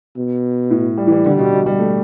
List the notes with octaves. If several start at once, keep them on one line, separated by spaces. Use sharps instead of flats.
B2
A2
G3
E3
G3
D3 G3
B2
B2
G3
A3